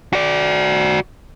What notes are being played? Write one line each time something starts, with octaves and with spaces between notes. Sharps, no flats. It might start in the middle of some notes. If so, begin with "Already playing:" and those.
F#4 D5